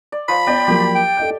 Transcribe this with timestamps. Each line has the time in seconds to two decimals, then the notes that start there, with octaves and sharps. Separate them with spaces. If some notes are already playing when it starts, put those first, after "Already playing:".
0.12 D5
0.28 F3 B5
0.47 B3 C#5 D5 G5
0.68 F3 F#3 A#3 G4
0.95 G5
1.17 A4 D#5 G6